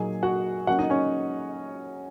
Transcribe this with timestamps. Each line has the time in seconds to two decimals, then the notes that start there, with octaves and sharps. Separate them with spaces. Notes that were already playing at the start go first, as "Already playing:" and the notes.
Already playing: A#2 F#3 A#3 D#4 G#4 G#5
0.23 F#4 F#5
0.67 F#3 A#3 C#4 F#4 F#5
0.79 D#4 D#5
0.90 C#4 C#5